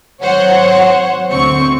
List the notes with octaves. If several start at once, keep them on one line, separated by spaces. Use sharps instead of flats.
G#1 F#3 C5 C#5 F#5
D2 C4 C#6